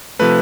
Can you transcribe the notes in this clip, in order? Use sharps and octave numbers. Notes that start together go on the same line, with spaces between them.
C3 F3 A3 B4